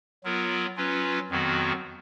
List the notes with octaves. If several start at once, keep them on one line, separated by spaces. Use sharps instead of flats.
F#3 B3 F4 A#4
F#3 C#4 F4 B4
F2 D#3 F#3 B3 F#4